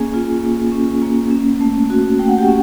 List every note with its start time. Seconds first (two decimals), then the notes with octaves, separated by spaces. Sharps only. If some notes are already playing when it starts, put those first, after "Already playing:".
Already playing: A#3 C#4 G#4 G#5
0.14 F4
0.43 A#3
0.72 C#4
1.02 A#3
1.31 C#4
1.61 A3
1.90 F#4
2.19 A3 G5
2.28 F#5
2.38 G4 G5
2.48 C#4